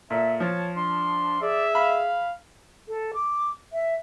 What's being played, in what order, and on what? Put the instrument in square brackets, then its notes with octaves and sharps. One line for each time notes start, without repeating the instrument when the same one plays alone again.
[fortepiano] A#2 [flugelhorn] A4 [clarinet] E5
[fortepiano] F3 [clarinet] C#5 [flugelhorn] A5
[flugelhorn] D4 [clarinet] C6
[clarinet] G#4 [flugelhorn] D5 [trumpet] E5
[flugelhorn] F5 [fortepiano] B5
[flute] A4
D6
E5